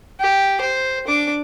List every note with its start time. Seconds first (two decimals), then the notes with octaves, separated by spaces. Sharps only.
0.20 G4
0.61 C5
1.08 D4 D6